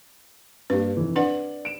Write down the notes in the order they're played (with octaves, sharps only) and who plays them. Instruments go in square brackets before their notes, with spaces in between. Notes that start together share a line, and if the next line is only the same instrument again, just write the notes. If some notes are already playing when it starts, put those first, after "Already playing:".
[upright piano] G2 A#3 G4 [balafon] B4
[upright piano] F1 E3
[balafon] D4 B4 F#5 [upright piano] D5 F#7
[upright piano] D7 E7